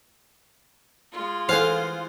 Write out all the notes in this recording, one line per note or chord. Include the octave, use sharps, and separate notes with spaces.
G#3 F4
E3 C5 F5 F#5 G#5